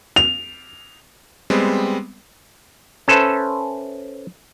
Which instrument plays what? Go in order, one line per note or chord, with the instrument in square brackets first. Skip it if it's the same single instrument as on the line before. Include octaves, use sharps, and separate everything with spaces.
[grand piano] F7
[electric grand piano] G3 G#3 B3 C4
[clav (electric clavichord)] C#4 A4 B4 C5 E5 A5